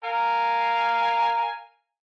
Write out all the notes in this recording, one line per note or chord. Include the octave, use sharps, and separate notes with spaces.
A#4 F5 G#5